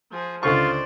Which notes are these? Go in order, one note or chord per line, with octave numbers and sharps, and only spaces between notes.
F3 G#4
C#2 D3 F4 C5 D5 C#6